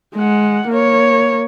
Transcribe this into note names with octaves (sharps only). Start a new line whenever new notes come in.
G#3 F#5
A#3 C#5